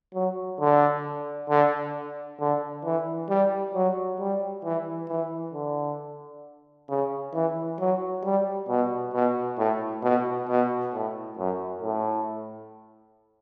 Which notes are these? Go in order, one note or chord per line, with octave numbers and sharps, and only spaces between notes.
F#3
D3
D3
D3
E3
G3
F#3
G3
E3
E3
D3
C#3
E3
F#3
G3
B2
B2
A2
B2
B2
A2
F#2
A2